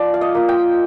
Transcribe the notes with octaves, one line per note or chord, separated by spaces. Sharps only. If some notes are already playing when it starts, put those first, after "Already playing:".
Already playing: F3 D5
F5
D#5
A#3 F4
G5